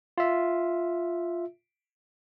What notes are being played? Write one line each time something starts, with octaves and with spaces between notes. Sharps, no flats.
F4 E5